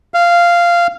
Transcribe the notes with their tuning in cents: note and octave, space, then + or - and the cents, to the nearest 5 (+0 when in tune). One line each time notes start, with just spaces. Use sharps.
F5 -10